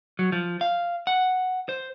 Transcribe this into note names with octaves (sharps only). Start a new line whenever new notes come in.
F#3
F3
F5
F#5
C5